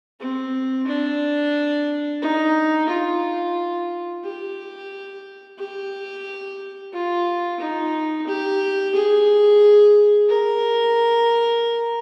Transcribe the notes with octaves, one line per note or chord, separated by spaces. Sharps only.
C4
D4
D#4
F4
G4
G4
F4
D#4
G4
G#4
A#4